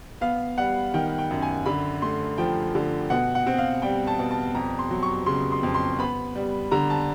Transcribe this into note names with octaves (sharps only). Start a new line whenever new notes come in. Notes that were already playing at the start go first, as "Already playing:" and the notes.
B3 F5
G3 F#5
D#3 G5
G5
F#2
G#5
D3 B5
A3 C6
F3 G5
D3
B2 F#5
F#5
C4
F5
G3 G5
A5
B2
A5
F2 A#5
C6
F#3
C#6
C#3 C6
C6
F2
C6
B3 B5
G3
D3 A#5
A5